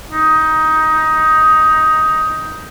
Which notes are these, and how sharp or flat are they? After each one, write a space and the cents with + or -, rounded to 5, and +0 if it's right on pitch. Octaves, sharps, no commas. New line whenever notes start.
D#4 +15